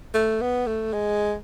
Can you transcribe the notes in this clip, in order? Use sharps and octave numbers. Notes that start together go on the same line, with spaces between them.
A3
B3
A3
G#3